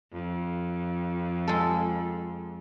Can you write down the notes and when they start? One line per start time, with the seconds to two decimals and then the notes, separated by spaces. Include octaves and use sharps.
0.12 F2
1.48 G#3 A4